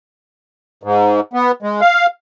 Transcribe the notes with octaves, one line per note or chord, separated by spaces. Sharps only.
G#2
B3
G#3
F5